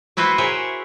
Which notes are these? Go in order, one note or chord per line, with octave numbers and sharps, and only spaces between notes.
A3 E4 F#4 B4 C5
G#4 A#4 C5 C#5 E5